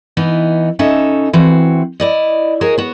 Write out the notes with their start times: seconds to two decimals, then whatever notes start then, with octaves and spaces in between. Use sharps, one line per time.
0.17 E3 B3 D#4
0.79 C#3 C#4 D#4 A4 E5
1.33 E3 C4 F#4
2.00 E4 D5 D#5
2.61 F#4 G#4 A#4 C#5 D#5
2.78 B3 F#4